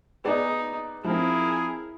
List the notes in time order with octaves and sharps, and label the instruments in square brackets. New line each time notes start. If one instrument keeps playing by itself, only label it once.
[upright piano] B3 G#4 D5 [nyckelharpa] D#4
[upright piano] F3 C4 [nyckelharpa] E4 A#4 [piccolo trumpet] G#4